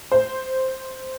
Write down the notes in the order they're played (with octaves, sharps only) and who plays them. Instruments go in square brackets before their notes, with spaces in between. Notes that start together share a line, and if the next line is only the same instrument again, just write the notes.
[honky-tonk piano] C5